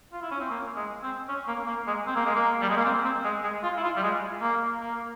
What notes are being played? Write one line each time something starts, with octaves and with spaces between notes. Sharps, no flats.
F4
E4
C#4
C4
A#3
G#3
C4
C#4
A#3
A#3
G#3
C4
A#3
G#3
A#3
G3
G#3
A#3
C4
C4
G#3
G#3
F4
E4
F4
G3
G#3
A#3
A#3